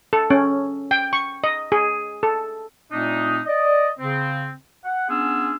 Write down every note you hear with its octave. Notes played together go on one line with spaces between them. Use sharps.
A4
C#4
G5
C#6
D#5
G#4
A4
A#2 A3 C4 D4 D#4
D5 D#5
C#3 C4
F#5
B3 C#4 D4 F4 G#4 E6